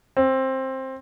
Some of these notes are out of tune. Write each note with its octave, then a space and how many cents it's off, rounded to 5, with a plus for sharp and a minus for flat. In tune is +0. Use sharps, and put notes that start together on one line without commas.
C4 +15